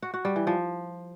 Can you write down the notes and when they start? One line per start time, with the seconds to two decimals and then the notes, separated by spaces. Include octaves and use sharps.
0.02 F#4
0.14 F#4
0.25 G3
0.36 E3
0.47 F3